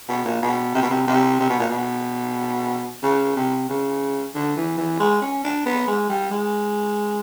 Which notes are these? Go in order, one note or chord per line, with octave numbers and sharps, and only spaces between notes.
B2
A#2
B2
C3
B2
C3
C3
C3
B2
A#2
B2
C#3
C3
C#3
D3
E3
E3
G#3
C#4
D4
B3
G#3
G3
G#3